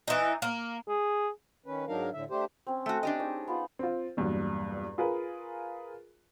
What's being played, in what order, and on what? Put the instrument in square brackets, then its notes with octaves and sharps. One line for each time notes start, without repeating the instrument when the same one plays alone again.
[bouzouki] E3 D#4
A#3
[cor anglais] G#4
[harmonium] D#3 C#4 B4
G#2 F#3 D4 D#4 A#4 F5
A2 D3 E5
A3 D4 G4 C5
[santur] C4 C#4
[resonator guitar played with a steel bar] A3 F#4
D4 G4 D#5
[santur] D#4 G#4 C#5
B3 F4 F5
[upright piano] C4 F4
E2 G2 A#2 F#3
F4 G#4 A#4 B4